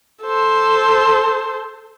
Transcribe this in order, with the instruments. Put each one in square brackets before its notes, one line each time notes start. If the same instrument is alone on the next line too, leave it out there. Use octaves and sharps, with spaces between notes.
[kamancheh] A4 C5